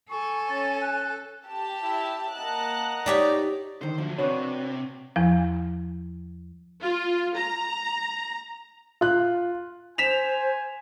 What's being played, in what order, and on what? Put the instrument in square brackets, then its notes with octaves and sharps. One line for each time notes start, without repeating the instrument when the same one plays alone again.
[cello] A4 [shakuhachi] G#5 [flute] C#6
[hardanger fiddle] C#4 [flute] A6
[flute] F#6
[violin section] G4 A5
[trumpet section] E4 E5
[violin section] A#3 A5 F#6 [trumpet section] D#5 F#5 A#5
[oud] D#4 G4 C#5 [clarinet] D5
[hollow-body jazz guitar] D3 D#3 [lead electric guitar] C5
[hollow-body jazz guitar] D2 [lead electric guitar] F3 F#3
[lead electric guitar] C3 [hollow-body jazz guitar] D4 F#4 B4 [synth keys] C#5 C#6 F#6
[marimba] E2 F3
[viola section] F4
A#5
[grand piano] F4 F#6
[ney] C5 [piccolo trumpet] G#5 [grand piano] B6 E7 F7